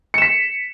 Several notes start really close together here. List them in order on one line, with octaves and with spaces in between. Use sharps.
C#7 E7 B6